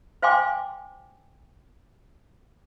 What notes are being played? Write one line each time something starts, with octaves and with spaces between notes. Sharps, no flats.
C5 F5 G5 G#5 C6 D6